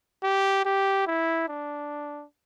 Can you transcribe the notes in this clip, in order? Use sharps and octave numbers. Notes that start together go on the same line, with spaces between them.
G4
G4
E4
D4